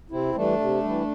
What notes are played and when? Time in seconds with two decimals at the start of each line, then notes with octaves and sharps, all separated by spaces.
0.10 C3 C4 E4
0.35 E3 G3 A3 D4
0.60 C3
0.84 E3 G3